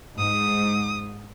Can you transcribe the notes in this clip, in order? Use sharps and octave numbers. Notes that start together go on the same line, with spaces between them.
G#2 D#6